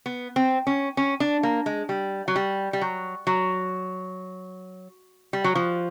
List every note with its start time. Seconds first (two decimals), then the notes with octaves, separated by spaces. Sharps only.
0.06 B3
0.36 C4
0.67 C#4
0.97 C#4
1.20 D4
1.43 A#3
1.66 G#3
1.89 G3
2.28 F#3
2.36 G3
2.73 G3
2.81 F#3
3.27 F#3
5.33 G3
5.44 F#3
5.55 F3